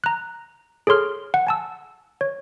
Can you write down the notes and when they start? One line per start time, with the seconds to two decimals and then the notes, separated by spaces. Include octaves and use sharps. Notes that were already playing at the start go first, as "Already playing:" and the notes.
0.04 A#5 F#6
0.87 G#4 A4 C#5 C6 F6
1.34 F#5
1.47 G#5 A5 E6
2.21 C#5